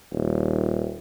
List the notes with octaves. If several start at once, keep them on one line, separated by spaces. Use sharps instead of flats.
D#1